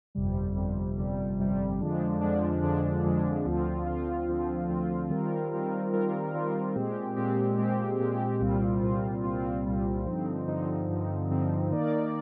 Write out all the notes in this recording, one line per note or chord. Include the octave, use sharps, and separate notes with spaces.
G1 F2 C3 G3
G1 F2 C3 G3
G1 F2 C3 G3
G1 F2 C3 G3
F2 D3 F3 G#3 D4
F2 D3 F3 G#3 D4
F2 D3 F3 G#3 D4
F2 D3 F3 G#3 D4
D2 D3 F3 C4 F4
D2 D3 F3 C4 F4
D2 D3 F3 C4 F4
D2 D3 F3 C4 F4
D#3 G3 C4 F4 A#4
D#3 G3 C4 F4 A#4
D#3 G3 C4 F4 A#4
D#3 G3 C4 F4 A#4
A#2 G#3 C4 G4
A#2 G#3 C4 G4
A#2 G#3 C4 G4
A#2 G#3 C4 G4
C2 A#2 G3 C4 F4
C2 A#2 G3 C4 F4
C2 A#2 G3 C4 F4
C2 A#2 G3 C4 F4
G2 D3 F3 C4 D#4
G2 D3 F3 C4 D#4
G2 D3 F3 C4 D#4
G2 D3 F3 C4 D#4
D#3 A#3 D#4 A#4 D5